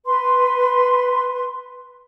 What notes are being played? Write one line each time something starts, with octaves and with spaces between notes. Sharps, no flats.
B4 C6